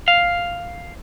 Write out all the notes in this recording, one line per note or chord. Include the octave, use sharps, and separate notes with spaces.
F5